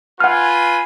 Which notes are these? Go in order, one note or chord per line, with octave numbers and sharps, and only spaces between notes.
F4 B4 F#5 G#5 F6